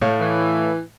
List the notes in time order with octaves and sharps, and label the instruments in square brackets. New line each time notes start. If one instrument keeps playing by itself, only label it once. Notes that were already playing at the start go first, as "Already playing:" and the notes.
[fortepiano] A2 [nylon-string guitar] A3 C#5 F5
[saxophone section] E3